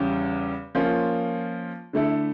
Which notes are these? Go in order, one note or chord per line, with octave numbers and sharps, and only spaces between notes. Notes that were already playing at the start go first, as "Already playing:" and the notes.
Already playing: E2 C#3 G3 C#4 G4
F3 A#3 C#4 F4
D3 A3 E4 A4